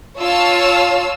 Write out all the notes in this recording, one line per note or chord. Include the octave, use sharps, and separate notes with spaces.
F4 C#5 A5 E6